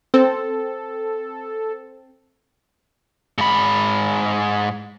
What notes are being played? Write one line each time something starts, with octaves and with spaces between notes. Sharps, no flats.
C4 A4
G#2 B5